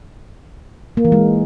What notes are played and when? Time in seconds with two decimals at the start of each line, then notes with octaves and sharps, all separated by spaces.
0.97 A#3
1.05 E3
1.12 G#3